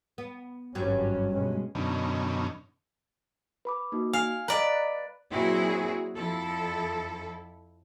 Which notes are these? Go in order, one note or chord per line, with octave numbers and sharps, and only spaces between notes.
B3
G#1 G2 F#3 C#4
B2 G#3 C#4
F#2 B2 D3 C#4 D#4
B4 B5 D6
A#3 D#4 F#4
F5 G#5
B4 D5 D#5 A#5
F#6
A#2 F#3 C4 E4 F#4 G#4
F2 F3 E4 A4